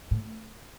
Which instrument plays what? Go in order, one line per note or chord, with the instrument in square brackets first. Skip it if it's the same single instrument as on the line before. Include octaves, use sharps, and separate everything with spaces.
[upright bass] A2